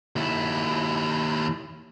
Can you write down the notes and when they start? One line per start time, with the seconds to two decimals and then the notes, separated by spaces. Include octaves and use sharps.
0.16 D#2 E4